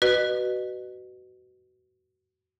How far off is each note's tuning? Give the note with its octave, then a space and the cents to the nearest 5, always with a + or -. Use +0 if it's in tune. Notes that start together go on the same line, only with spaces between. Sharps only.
F#4 +20 B4 +0 D#5 -30